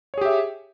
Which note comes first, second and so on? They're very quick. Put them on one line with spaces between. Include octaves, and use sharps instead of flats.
C#5 G#4 G4 E5